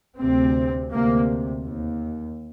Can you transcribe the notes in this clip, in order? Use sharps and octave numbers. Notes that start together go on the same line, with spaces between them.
D2 C3 C4
D2 C3 A#3
D#2